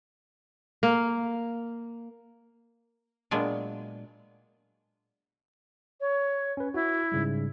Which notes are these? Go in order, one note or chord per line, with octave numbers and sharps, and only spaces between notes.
A#3
A#2 F#3 G#3 B3 D4
C#5
C#4 B4
E4 F#4
G#2 C#3 G3